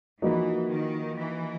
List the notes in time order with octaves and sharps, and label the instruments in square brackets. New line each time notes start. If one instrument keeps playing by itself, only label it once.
[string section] E3 [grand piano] F3 A#3 D#4 F#4 B4
[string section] D#3
E3